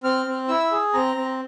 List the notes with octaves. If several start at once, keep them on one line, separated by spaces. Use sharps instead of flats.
C4 F6
C4
E4 E6
G#4
C4 A#5
C4